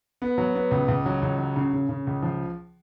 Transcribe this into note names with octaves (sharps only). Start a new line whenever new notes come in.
B3
F#3
B3
C#2
C#2
F#3
C#2
F#3
C#3
C#3
C#3
C#2
F3